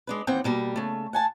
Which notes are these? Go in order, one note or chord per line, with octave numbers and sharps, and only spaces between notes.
G#3 D4 B4
D#2 E3 C4 F#5 G5
B2 G3 A#3
C#3 A3
F#5 G#5 A5